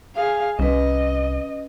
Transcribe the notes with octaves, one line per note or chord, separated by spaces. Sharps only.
G#4 F5
C2 C#4 B4 D#5